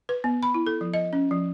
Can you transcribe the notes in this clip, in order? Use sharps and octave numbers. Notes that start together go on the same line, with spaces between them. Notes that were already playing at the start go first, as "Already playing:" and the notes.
B4
B3
B5
E4
A4
F3
D#5
C#4
F3